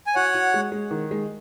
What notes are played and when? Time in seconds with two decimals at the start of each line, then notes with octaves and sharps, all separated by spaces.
0.07 G#5
0.15 F#4 C#5 F#5
0.35 F#4
0.54 G#3
0.72 G#3
0.91 D#3
1.11 G#3